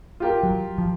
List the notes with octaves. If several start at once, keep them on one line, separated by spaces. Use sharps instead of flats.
F4 G4 A#4
F#3
F3